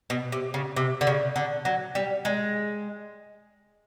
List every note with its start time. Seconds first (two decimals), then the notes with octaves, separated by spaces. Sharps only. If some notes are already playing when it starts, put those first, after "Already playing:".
0.10 B2
0.32 C3
0.54 C#3
0.76 C3
1.01 D3
1.07 C#3
1.36 D3
1.65 F#3
1.95 G3
2.25 G#3